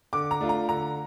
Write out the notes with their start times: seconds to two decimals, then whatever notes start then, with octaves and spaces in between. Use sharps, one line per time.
0.13 D3 D6
0.31 A#5
0.41 A3 D4 F4
0.49 A#5
0.69 D3 A#5